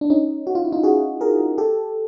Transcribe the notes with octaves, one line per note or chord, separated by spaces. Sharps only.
D4
C#4 D#4
F#4
F4
E4
D#4 F4
F#4 G#4
G#4 A#4
G4 A4